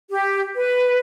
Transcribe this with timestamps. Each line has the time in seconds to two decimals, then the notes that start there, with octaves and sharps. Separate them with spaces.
0.10 G4
0.55 B4